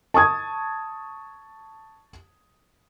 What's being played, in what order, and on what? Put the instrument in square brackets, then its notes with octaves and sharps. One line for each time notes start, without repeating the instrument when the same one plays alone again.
[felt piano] A5 C#6 D#6 G#6